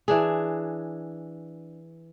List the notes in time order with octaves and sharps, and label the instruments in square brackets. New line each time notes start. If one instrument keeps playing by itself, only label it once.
[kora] E3 D4 G#4